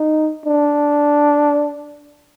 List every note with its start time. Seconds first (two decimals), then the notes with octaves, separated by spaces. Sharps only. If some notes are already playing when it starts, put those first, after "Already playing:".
Already playing: D#4
0.46 D4